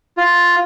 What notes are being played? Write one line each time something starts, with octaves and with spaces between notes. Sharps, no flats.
F4